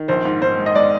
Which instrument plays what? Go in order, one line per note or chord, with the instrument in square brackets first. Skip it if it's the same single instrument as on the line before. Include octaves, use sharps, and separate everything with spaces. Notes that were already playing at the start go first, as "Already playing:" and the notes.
Already playing: [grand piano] D#3
[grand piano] A#1 [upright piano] C5
[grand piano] G#2
[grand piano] G#2 [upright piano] C5
[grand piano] G#3
[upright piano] D#5
[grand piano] G#3 [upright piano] D5